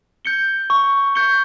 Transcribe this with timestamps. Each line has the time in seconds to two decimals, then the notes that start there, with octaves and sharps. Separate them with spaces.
0.25 G6 C#7 G7
0.70 C#6
1.15 G6 C#7 G7